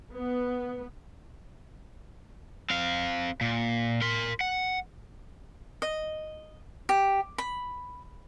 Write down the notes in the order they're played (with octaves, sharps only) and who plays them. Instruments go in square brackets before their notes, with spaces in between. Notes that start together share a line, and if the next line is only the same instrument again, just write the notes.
[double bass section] B3
[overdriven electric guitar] C4 F5
A#2
A#4 C6
F#5
[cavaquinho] D#5
G4
B5